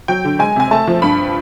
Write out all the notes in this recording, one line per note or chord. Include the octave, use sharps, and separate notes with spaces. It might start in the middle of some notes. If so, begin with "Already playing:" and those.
F#3 G5
D3
G#3 G#5
C3 G#5
A3 A5
F3
G2 B5